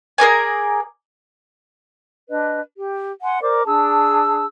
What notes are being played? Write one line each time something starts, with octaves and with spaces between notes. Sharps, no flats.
G#4 A#4 D5 G#5
D4 B4 D#5
G4
F#5 G#5 C6
A#4 C5 D5 D6
D4 G#4 A5 E6